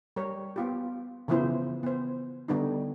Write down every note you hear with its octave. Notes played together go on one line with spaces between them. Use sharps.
G3 A#4 C#5
B3 F4 G4
C#3 E3 F3 B3 E4 C5
B3 C5
D3 G3 B3 D4 D#4